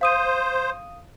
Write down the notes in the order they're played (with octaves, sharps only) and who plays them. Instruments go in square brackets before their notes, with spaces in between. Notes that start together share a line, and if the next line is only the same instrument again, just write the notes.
[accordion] C5 [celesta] F5 D#6 D#7